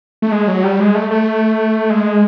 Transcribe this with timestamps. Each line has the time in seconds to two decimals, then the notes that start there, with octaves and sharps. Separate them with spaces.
0.22 A3
0.32 G#3
0.48 F#3
0.64 G3
0.79 G#3
0.95 A3
1.11 A3
1.90 G#3